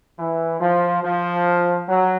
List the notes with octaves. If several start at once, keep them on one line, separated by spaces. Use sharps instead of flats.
E3
F3
F3
F#3